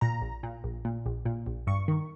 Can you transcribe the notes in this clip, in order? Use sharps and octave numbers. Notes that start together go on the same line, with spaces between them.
A#2 A#5
A#1
A#2
A#1
A#2
A#1
A#2
A#1
G2 C#6
D#3